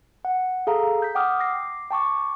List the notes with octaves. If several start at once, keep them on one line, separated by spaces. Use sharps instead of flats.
F#5
G#4 A4 F5 A#5
G6 B6
F#5 G5 D6 D#6 F6
D6 A#6 C7
G5 A5 C#6 D6